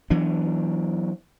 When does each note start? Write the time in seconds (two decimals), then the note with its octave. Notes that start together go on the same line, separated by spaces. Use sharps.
0.10 E3 F#3 B3 D4